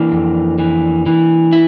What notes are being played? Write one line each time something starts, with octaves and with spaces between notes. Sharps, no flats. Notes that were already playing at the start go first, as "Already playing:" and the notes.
Already playing: E3 A#3 D4
F2
E3
E3
E4